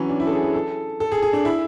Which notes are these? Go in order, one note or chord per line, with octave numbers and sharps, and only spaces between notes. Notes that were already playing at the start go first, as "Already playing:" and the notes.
Already playing: E3 F#3 C#4
D4
E4
A4
G#4
G#4
A4
A4
G#4
G#4
D4
E4